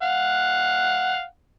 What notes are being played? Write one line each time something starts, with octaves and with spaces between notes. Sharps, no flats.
F5 F#5